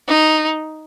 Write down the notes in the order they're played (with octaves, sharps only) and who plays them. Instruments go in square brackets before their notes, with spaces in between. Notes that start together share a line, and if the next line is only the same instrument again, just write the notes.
[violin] D#4